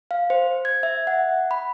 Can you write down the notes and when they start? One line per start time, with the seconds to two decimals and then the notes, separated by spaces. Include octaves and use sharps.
0.11 F5
0.30 C5
0.65 G#6
0.83 E5
1.07 F#5
1.51 B5